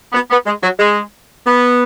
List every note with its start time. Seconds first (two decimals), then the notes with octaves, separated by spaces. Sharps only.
0.13 B3
0.30 B3
0.46 G#3
0.62 F#3
0.79 G#3
1.45 B3